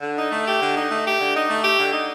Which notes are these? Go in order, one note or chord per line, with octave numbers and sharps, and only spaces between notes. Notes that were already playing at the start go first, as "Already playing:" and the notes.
D3
D#4
A3
G4
D3
D#4
A3
G4
D3
D#4
A3
G4
D3
D#4